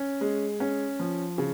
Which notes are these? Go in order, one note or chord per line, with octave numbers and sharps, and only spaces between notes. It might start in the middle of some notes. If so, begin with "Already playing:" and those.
Already playing: C#4
G#3
C#4
F3
C#3